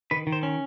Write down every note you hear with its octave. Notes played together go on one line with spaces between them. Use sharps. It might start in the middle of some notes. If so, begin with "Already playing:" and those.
D#3 B4
D#3
C5
C#4